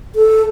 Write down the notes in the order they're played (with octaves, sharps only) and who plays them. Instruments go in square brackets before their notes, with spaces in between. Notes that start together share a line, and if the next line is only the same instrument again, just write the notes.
[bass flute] A4